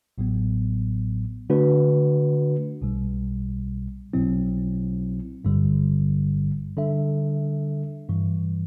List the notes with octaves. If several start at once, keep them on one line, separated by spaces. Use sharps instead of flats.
A1 A2 F#3 B3
D3 A3 D4 F#4 B4
B1 B2 G3
B1 B2 F#3 C4 E4
G1 G2 D3 G3
D3 G3 D4 A4 E5
G2 E3 G3